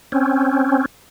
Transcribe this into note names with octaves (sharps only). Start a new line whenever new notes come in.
C4 C#4